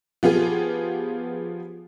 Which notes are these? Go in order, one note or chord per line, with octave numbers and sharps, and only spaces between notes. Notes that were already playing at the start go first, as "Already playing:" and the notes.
F3 B3 F4 G4 G#4